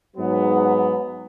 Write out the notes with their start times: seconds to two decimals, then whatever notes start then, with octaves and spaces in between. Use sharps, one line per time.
0.16 G#2 F#3 B3